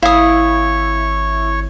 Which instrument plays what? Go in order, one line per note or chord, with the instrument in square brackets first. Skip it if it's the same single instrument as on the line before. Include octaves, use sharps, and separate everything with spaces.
[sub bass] G#1 [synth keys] E4 [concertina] C#5 C#6 [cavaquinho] F5 D#6